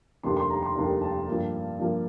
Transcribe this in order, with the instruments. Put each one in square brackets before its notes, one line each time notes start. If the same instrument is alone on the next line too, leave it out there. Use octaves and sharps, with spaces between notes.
[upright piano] F1 D#2 D#3 G3 D4 C6
C6
A#5
C6
F1 D#2 D#3 G3 D4 A#5
A5
G2 F3 A#3
G2 F3 A#3